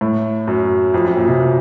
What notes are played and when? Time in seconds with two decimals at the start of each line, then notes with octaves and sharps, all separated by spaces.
0.01 A2
0.47 F#2
0.94 F2
1.05 F#2
1.17 A#2
1.28 C3
1.40 A#2